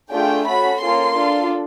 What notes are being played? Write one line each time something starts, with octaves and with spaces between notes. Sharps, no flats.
A3 D4 F4 G#4 G5
C#4 F#4 A4 B5
A#3 C#4 F4 A4 C6
D4 F4 A4